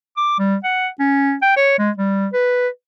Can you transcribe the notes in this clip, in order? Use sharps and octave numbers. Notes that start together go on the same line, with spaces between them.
D6
G3
F#5
C#4
G5
C#5
G#3
G3
B4